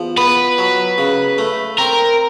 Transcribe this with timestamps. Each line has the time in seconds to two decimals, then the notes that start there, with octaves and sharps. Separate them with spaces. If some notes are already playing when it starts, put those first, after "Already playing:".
Already playing: E2 F3
0.17 B3 B4
0.58 F#3
0.98 C#3
1.38 A3
1.78 C4 A#4